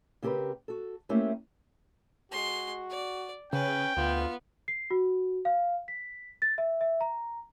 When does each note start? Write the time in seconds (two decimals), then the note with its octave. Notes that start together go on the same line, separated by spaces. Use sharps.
0.22 C#3 C4 G4 G#4 A#4 B4
0.68 F#4 A4
1.09 A3 A#3 C4 C#4 E4 G4
2.32 G#3 F#4 C6
2.90 D5
3.53 C#3 C#4 B4 G5
3.97 D2 B3 F4
4.68 C7
4.91 F#4
5.45 F5
5.88 B6
6.42 A6
6.58 E5
6.81 E5
7.01 A#5